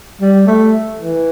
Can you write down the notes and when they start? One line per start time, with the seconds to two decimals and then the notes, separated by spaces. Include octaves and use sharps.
0.21 G3
0.47 A3
0.97 E3